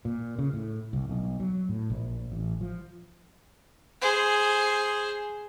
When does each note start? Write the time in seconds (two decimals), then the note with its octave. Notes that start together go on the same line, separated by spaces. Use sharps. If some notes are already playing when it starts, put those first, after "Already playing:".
0.05 A#2
0.38 C#3
0.53 A2
0.93 C2
1.09 B1
1.40 F#3
1.69 A2
1.90 A#1
2.32 A1
2.61 F3
4.01 G#4 C5